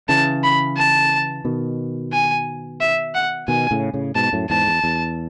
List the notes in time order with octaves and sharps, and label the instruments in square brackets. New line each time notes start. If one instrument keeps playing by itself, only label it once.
[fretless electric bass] C#3 E3 [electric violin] A5
[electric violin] B5
A5
[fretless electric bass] B2 D#3
[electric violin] G#5
E5
F#5
[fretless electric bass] B2 D#3 [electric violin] G#5
[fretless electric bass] A2 C#3
A2 C#3
[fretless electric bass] G#2 B2 [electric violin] A5
[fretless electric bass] F#2 A2
[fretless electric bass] E2 G#2 [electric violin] A5
[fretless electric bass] E2
E2